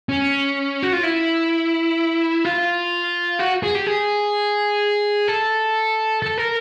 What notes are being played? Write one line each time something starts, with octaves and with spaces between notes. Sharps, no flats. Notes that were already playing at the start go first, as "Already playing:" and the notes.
C#4
F#4
F4
E4
F4
F#4
G#4
G4
G#4
A4
A4
A#4